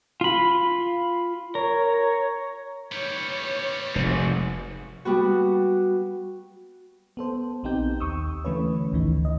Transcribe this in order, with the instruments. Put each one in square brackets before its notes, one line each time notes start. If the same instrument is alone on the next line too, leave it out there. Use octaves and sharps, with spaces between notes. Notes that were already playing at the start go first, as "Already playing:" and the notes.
[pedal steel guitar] F4 B5
[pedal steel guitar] A#4 [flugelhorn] C#5
[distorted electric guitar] G3 B3 [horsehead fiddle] C#5
[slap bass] F1 [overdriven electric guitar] G#2 F#4
[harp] G3 B3 F#4
[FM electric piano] B3 A4 C5
A#1 B3 C4 D#4 G4 G6
D#2 C#6 D#6 E6
D3 E3 A3 C#4 B4 C#5
G#1 D2 D#3 E3 D#4
D#5